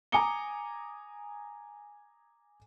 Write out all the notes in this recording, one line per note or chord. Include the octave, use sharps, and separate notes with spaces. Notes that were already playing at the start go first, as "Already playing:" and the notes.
G#5 A#5 D6 D#6 C#7 G7